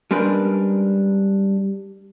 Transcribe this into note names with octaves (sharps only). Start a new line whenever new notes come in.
G3 G#3 C#4 D4 A#4 B4